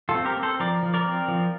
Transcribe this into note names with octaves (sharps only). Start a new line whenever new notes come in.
F4 A4
C4
G4 A#4
C4
A4 C5
F3 A#4 D5
F3
A#4 D5
C4
F3